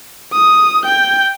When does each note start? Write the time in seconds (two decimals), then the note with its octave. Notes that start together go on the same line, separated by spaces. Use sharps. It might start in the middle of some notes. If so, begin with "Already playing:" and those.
0.33 D#6
0.84 G5 G6